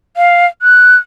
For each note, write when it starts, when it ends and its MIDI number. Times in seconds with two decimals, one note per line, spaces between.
0.17 0.46 77
0.62 0.97 90